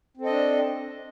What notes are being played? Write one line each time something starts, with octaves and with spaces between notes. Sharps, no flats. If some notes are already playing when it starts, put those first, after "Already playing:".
C4 D4 A4 D#5